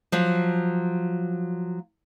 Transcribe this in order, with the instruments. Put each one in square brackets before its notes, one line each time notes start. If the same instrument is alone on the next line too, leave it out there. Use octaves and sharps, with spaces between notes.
[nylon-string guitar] F3 F#3